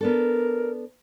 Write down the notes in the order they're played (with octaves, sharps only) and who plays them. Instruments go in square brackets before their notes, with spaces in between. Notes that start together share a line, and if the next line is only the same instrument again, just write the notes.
[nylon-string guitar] B3 D4 A4 [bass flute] A#4